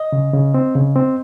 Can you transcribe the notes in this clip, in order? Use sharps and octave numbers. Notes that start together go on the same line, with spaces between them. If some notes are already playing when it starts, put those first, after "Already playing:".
Already playing: D#5
C#3
C#3
C4
C#3
C4